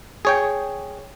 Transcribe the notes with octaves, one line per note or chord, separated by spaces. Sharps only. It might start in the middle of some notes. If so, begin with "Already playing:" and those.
G#4 C#5 G5